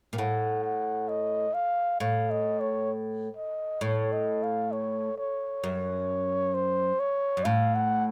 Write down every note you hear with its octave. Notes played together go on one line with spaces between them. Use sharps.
A#2
A2 F#5
F#5
D#5
F5
A2 F5
D#5
C#5
D#5
A2 C#5
D#5
F5
C#5
C#5
F#2
C5
C#5
F#2
A2 F5
F#5